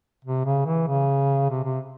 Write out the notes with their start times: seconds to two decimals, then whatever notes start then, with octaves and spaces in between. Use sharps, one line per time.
0.25 C3
0.45 C#3
0.66 E3
0.88 C#3
1.50 C3
1.64 C3